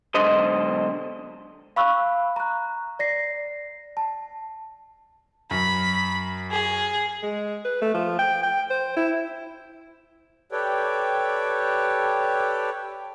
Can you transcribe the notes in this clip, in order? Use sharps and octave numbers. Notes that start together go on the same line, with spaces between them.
B1 G#2 D3 C5 D#5
F5 B5 C#6 E6 F#6
A#5 F#6
D5 A#6 C7
A5
F#2 B5
G#4
G#3
B4
A3
F3
G5
G5
C5
E4
G4 A4 B4 C#5 D5 G5